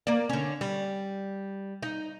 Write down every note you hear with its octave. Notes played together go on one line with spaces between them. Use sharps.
A#3 D5
D3 C#4
G3
D#4